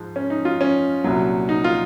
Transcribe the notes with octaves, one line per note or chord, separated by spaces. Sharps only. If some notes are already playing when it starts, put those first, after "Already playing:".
Already playing: G#2 F3
C#4
D#4
F4
C#4
C2 A#2 F#3
D#4
F4